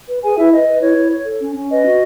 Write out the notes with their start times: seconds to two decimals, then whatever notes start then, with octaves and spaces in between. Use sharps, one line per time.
0.08 B4
0.22 G#4 B4 G#5
0.38 E4 B4 E5
0.52 B4 D#5
0.67 B4
0.81 E4 C#5
0.96 E4
1.12 C#5
1.25 A4
1.41 C#4
1.56 C#4
1.70 B4 D#5
1.85 F#4